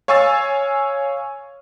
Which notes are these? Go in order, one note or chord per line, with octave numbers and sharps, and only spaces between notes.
C#5 F5 G#5 C#6 E6 A6